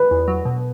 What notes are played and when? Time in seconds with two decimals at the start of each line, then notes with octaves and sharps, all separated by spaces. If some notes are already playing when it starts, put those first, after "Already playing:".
Already playing: B4
0.11 E2
0.28 F#3
0.45 B2